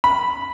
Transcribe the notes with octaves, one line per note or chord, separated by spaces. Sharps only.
B5